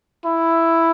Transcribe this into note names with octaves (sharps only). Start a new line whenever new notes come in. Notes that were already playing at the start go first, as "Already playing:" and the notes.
E4